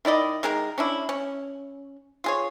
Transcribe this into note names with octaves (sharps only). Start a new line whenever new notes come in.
D#3 E4 D5 D#5
D#3 G#3 G#4 A#4
C#4 D4 E4
C#4
F4 G#4 C#5